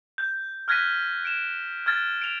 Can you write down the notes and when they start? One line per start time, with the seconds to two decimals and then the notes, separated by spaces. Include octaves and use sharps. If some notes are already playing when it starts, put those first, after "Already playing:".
0.18 G6
0.68 F6 F#6 G#6 A#6 B6 D#7
1.25 D7 E7
1.86 F6 G#6 A6
2.21 D7 F7